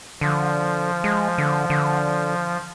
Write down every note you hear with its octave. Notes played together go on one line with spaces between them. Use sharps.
D3 F3
G#3
D3
D3